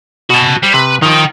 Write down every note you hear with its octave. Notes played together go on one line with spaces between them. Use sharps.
B2 F#4 G#5 A5
G3 C5
C3 B4
D#3 F3 D#4 G5